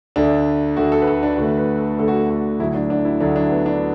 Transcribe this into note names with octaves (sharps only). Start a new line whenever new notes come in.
D2 D3 A3 D4
D2 D3 A3 F#4
A4
B4
A4
D4
D2 D3 A3 F#4
B4
A4
D2 D3 A3 A4
F#4
A4
F#4
D2 D3 F#3 A3 E4
D4
D4
E4
D2 D3 F#3 A3 D4
D4
B3
D4